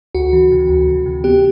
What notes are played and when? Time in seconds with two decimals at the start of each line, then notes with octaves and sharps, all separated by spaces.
0.15 D2 F#4
0.33 E3
0.52 C3
0.69 D2
0.88 E3
1.06 C3
1.24 B3 G4